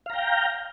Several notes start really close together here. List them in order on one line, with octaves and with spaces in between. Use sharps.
F5 A#5 G5